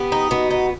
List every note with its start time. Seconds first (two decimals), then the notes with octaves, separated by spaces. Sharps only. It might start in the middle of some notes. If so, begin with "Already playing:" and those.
Already playing: B3 G4
0.12 D#4
0.31 B3 F#4
0.51 D#4